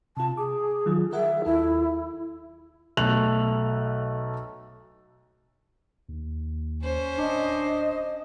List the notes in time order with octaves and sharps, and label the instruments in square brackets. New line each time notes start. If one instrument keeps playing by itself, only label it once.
[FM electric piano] C3 F4 [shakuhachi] A5
[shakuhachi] G#4 [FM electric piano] D6
[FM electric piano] D#3 F#3 F4
[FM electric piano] G#4 A#4 F#5 [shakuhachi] E5
[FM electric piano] D#2 F4 A4 [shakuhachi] E4
[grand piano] B1 A3 F#6 F7 F#7
[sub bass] D#2
[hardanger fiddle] C#4 C5
[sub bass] D1 [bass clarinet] D4 [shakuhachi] D#5